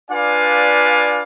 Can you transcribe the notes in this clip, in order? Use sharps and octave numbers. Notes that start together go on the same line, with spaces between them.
D4 F4 B4 D5 F5 G#5